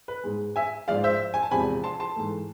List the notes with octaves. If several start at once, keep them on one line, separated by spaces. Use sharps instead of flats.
B4
G#2 G#3
E5 G#5
G#2 F3 G#3 D5 F5
C5 E5
G#5
A5
E2 C3 F3 G#3 G#5 B5
A5 C6
A5 C6
G#2 E3 A3